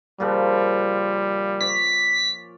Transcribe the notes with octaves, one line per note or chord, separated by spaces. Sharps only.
A#2 C#3 F3 G3
C#5 D5 B6